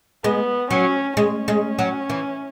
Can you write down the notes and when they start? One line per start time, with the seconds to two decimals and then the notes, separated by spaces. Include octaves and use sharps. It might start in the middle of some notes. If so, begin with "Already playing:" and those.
0.24 G#3 B3
0.70 F#3 C#4
1.17 G#3 C#4
1.48 G#3
1.79 F#3
2.10 E3